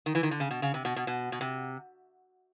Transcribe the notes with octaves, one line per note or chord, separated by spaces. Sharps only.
D#3
E3
D#3
D3
C#3
B2
C#3
C3
B2
B2
B2
B2
C3